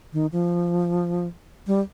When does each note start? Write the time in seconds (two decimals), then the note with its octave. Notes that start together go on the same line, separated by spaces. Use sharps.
0.13 D#3
0.32 F3
1.67 G3